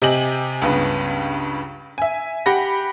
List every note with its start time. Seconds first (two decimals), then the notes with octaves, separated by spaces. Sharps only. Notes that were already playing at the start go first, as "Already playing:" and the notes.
0.02 C3 G4 D#5 G#5 F#7
0.62 C#2 G2 C#3 B3
1.98 E5 G#5
2.46 G4 F#5 B5 A#6